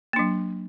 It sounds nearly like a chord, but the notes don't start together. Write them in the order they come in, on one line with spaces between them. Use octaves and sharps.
A#3 D4 F#3